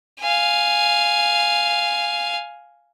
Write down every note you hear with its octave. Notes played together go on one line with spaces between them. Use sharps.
F5 G#5